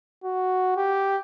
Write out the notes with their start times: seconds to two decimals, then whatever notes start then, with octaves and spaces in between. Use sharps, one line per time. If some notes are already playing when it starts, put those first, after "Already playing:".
0.24 F#4
0.76 G4